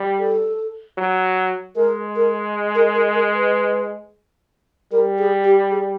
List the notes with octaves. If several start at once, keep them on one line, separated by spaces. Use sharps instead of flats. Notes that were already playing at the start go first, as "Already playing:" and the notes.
Already playing: G3
A4
F#3
G#3 A#4
A#4
A#4
A#4
A#4
B4
G3 A#4
G#4
G4
G#4